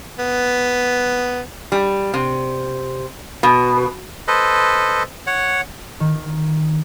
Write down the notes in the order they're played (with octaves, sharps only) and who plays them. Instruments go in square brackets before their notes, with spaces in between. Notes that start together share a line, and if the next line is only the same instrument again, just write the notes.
[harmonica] B3
[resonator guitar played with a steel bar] G3
C3
B2
[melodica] A4 B4 C5 D#5
C#5 F#5
[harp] D#3